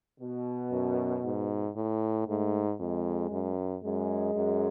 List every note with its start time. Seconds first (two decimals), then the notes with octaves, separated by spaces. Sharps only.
0.20 B2
0.72 F#2
1.24 G#2
1.76 A2
2.27 G#2 A3
2.79 F2 G#3
3.31 F#2
3.83 F#2 G#3
4.35 F#2